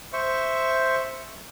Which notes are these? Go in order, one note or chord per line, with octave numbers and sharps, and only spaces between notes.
C5 E5 C#6